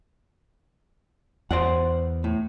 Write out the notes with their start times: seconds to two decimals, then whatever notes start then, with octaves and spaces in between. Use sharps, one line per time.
1.51 E2 C5 D5 F#5
2.24 A2